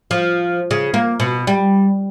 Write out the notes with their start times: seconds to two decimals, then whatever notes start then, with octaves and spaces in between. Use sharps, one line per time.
0.11 F3
0.71 C#3
0.94 A#3
1.20 B2
1.47 G3